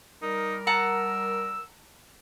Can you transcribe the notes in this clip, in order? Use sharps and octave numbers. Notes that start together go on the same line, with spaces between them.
G3 D#4 A#4
F#5 A5 A#5 E6